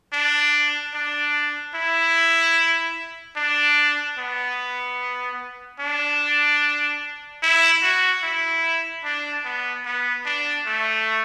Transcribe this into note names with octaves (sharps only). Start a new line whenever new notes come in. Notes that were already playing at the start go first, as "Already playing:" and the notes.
D4
D4
E4
D4
B3
D4
E4
F#4
E4
D4
B3
B3
D4
A3